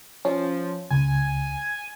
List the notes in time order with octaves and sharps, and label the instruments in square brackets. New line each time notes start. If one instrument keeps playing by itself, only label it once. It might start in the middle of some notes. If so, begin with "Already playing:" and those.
[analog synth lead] F3 [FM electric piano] C#4
[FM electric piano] C#2 [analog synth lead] G#5